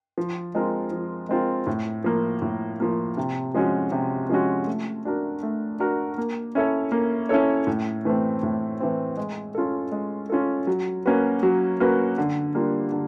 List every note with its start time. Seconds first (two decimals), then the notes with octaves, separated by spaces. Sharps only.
0.18 F3
0.55 G#3 C4 F4 A#4
0.92 F3
1.29 G#3 C4 F4 A#4
1.67 A2
2.04 F3 A#3
2.42 A2
2.80 F3 A#3
3.17 C3
3.54 F3 G#3 C#4 F#4
3.92 C3
4.30 F3 G#3 C#4 F#4
4.67 A3
5.05 D4 F#4 A#4
5.43 A3
5.80 D4 F#4 A#4
6.18 A#3
6.55 C#4 E4 A4 C#5
6.92 A#3
7.29 C#4 E4 A4 C#5
7.67 A2
8.05 E3 A3 C4
8.43 A2
8.80 E3 A3 C4
9.17 G#3
9.55 C#4 F4 A4
9.92 G#3
10.30 C#4 F4 A4
10.67 F#3
11.06 A#3 C#4 F#4 B4
11.43 F#3
11.80 A#3 C#4 F#4 B4
12.18 D3
12.55 G3 A#3 D4 F4
12.92 D3